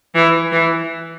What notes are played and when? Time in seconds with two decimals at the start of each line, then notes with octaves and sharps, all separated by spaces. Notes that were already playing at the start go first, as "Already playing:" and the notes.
0.15 E3
0.52 E3